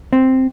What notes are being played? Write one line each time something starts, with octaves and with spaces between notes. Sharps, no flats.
C4